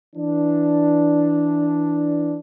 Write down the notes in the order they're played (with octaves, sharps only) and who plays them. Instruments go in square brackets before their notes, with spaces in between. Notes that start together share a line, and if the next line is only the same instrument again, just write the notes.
[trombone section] E3 D4